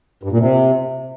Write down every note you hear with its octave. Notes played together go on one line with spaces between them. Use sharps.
G2
A#2
C3